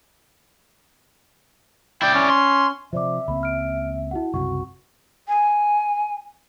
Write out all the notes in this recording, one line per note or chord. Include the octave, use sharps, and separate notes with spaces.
E4 D5 G5
C#4
C6
C3 F3 C5 D5 E5 D6
C#2 A#3 C4 B5
F6 D7
E4 F#4 F#5
F#1 C2 C3 F#4 F#5 C#6
G#5